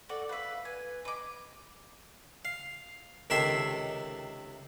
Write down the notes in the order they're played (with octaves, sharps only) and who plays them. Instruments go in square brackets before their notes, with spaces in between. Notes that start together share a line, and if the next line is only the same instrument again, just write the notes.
[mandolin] F#4 D5 [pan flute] A4
[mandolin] B4 E5 [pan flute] F5
[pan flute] B4 [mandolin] G#5
[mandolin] B4 D6 [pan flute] D#5
[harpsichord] F5
C#2 C3 D#3 A4 E5 C6